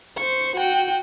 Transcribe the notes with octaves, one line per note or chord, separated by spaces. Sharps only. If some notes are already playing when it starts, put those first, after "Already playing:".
C5 C#6
F#4 G5